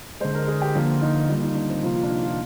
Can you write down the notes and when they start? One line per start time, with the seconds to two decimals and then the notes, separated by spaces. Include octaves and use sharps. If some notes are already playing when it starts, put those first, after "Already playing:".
0.20 D3 G#3 C5
0.35 A#4
0.48 G#4
0.62 G4
0.75 D3 F3 A#3 F4
1.01 D#4
1.28 D#3 G3 A#3 F4
1.42 D#4
1.55 D4
1.70 C4
1.83 C3 F3 A#3 F4
1.96 F4
2.03 D4
2.09 D#4
2.23 F4